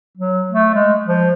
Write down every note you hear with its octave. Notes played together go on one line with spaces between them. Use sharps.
F#3
A3
G#3
F3